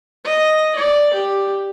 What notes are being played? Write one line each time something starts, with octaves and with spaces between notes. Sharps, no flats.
D#5
D5
G4